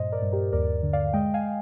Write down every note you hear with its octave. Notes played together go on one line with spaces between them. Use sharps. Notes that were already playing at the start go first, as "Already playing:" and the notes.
Already playing: G2 A#2 C5 D#5
A#4 D5
G2
G4 A#4
D#2 A#4 D5
D3
D5 F5
G#3 D#5 G5
F5 G#5